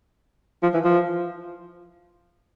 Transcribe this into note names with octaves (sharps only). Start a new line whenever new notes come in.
F3
E3
F3